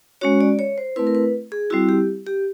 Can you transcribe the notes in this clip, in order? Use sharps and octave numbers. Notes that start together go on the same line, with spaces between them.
G#3 C#4 F#4 C#5
D5
C#5
C5
A3 C4 E4 B4
A#4
B4
G#4
G3 C4 E4 F#4
G4
G4